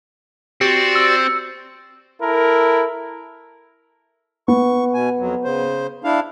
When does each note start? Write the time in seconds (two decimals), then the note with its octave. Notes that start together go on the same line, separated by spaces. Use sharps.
0.61 C4 F#4 G4 D5 A6 C#7
0.96 E6
2.22 E4 A4 A#4
4.48 B3 C#6
4.94 B2 G#5
5.19 F2 F#3
5.44 C#3 C5
6.04 D4 E4 F5